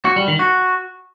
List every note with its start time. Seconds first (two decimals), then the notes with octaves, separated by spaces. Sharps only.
0.05 F#4
0.16 G3
0.28 D#3
0.39 F#4